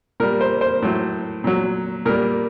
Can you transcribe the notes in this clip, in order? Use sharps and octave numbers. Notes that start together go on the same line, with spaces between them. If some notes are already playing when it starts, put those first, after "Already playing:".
A#2 G3 A#4
C5
C5
A2 F#3
A#2 F#3
A#2 G3 A#4